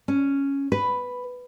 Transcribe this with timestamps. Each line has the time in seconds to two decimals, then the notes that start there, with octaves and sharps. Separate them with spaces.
0.08 C#4
0.72 B4